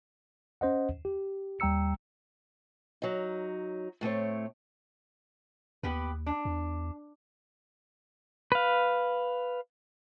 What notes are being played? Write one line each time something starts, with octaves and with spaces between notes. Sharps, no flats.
C#4 C5 D#5 F#5
G4
D#2 G3 G5 A#5 E6 C#7
F#3 D#4
A2 A3 C4 C#5
D#2 B3 G4 B4
D4
E2
B4 F5